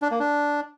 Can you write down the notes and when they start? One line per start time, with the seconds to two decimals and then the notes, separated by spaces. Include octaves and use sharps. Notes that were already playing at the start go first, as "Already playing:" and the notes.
0.02 D4
0.11 A#3
0.20 D4